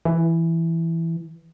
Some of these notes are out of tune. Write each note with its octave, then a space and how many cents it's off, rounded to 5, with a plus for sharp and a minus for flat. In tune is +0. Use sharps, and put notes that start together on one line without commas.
E3 +5